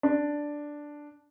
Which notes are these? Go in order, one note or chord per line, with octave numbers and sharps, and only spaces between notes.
D4